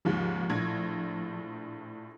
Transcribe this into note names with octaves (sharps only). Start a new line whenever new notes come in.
D#2 G#2 C#3 F3
A#1 A2 G#6